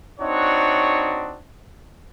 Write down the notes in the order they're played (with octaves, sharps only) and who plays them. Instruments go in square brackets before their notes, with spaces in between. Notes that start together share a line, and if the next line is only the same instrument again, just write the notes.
[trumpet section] C4 D4 D#4 F#4 C#5